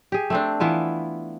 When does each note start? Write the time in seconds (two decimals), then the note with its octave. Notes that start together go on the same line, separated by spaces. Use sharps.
0.12 G4 G#4
0.30 A3 C4 D4
0.60 E3 B3 E4 F4